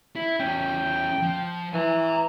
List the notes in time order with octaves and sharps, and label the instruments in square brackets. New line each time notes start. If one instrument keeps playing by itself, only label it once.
[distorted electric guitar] E4
[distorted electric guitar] E2 C#4 [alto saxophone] G5
[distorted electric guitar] F3
[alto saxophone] E3 [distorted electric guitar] G#5 A#5